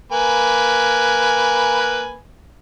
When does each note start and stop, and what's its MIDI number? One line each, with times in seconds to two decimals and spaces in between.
0.12 2.17 58
0.12 2.17 71
0.12 2.17 80